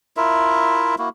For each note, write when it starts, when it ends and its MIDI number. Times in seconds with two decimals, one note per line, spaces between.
0.17 0.95 64
0.17 0.95 65
0.17 0.95 70
0.17 0.95 76
0.98 1.09 58
0.98 1.09 64
0.98 1.09 66